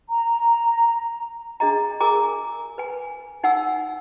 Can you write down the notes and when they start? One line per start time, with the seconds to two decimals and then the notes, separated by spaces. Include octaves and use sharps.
0.10 A#5
1.60 D4 G#4 D#5 A#5
2.00 G#4 A#4 G#5 A#5 D6
2.78 B4 G#5
3.43 D#4 F#5 G#5 E6